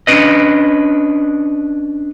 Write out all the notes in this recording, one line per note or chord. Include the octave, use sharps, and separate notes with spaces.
C#4 D4 B4 D#5